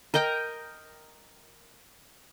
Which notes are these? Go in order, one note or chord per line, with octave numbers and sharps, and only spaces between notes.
A#4 D#5 G5 A#5